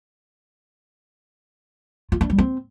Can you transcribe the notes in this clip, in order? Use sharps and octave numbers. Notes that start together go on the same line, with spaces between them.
F4
D4
G3
C4